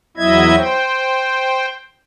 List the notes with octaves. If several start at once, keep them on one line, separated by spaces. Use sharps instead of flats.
E2 F#3 E4 D#5 E5 G#6
C5 G5